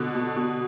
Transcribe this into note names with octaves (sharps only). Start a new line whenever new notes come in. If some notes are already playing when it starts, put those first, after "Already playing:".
Already playing: B2 D3
B2
B2